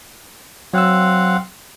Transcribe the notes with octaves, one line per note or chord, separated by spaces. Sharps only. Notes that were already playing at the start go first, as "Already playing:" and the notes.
F#3 C4 F5 F#5 E6